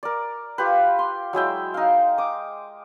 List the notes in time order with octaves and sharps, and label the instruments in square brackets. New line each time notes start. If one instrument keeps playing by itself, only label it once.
[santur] A#4 D5
F4 G4 B4
C6
F#3 G#3 E4 G5
D#4 F5
D6 D#6